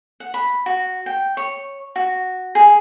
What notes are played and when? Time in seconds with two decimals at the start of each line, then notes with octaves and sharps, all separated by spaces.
0.20 F#5
0.34 B5
0.66 F#4
1.06 G5
1.37 C#5
1.96 F#4
2.55 G#4